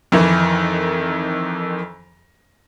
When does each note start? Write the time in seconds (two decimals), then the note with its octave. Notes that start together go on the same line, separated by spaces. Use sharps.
0.12 F2 D#3 E3